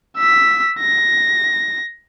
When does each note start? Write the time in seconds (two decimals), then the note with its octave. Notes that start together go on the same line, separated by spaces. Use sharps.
0.17 E6 B6
0.79 A#6